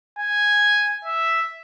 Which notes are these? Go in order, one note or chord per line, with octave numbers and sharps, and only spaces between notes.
G#5
E5